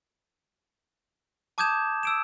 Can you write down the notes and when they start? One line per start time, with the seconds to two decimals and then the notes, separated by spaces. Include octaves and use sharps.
1.58 A5 D6 D#6 G6 G#6 E7
2.03 E6 D7 E7